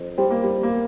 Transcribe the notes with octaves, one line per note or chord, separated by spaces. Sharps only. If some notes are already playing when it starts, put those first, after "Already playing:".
Already playing: F2
G3 C4
A#3
G3
A#3